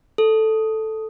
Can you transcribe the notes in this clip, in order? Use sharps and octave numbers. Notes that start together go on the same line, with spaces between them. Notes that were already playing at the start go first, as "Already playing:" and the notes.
A4